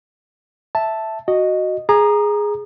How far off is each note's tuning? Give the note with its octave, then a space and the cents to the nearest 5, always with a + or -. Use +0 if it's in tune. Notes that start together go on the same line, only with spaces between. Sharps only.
E5 +0 A5 +0
F#4 +0 D#5 -5
G#4 +0 A#5 +10 D#6 -40